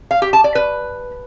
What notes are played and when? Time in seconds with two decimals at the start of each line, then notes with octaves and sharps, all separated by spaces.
0.11 F5
0.22 G4
0.33 A5
0.44 D5
0.55 B4